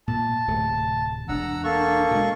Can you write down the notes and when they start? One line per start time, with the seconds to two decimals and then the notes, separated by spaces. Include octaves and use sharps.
0.08 A#2 A5
0.48 D1 C3 A3
1.29 E1 E2 D4 F#5 A#5 E6
1.64 A#3 A4 C#6
2.11 B2 G#3